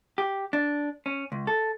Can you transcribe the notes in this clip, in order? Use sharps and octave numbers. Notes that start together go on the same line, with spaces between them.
G4
D4
C#4
C#2
A4